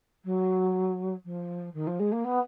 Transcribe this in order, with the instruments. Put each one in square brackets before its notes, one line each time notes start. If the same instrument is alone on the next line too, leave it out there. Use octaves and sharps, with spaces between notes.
[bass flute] F#3
F3
D#3
F3
G#3
A#3
B3